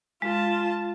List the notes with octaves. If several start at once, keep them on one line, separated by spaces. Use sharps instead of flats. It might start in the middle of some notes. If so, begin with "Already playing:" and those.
G#3 F4 A5